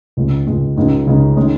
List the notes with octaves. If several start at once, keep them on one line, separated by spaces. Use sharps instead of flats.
C#2 C#3 G#3
C#2 C#3 G#3
C#2 C#3 G#3 D#4
C#2 C#3 G#3 D#4
D#3 G#3 C#4 G#4 D#5